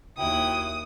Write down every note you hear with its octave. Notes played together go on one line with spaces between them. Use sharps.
D#2 F#3 E4 G5 D#6